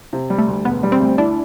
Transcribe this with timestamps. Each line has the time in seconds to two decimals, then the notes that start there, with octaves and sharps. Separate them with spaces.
0.13 C3
0.30 G3
0.38 A3
0.48 D2
0.65 E1 B3
0.83 G3
0.92 C4
1.00 D2
1.18 D4 E4